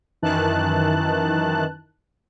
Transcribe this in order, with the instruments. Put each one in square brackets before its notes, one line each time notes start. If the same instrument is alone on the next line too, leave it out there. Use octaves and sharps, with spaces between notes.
[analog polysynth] F#2 D#3 E3 A5 F#6